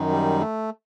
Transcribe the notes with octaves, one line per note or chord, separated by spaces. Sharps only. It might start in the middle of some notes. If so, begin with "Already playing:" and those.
Already playing: F#2 D#3
G3
A3